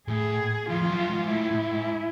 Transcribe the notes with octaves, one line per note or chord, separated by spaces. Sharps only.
A2 G#4
F2 F4
F2
F#2
G#2
A2 E4
A2
G#2